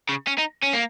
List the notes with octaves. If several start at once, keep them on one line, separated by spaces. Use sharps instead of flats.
C#3
C#4
D#4
C#4
A#3